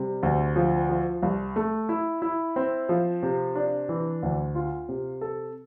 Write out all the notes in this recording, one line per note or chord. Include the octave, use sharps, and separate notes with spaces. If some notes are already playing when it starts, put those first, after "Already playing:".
Already playing: C3 G3
D2
F3
F3
C2
A3
E4
E4
C4
F3
C3
D4
E3
D2
F4
C3
A4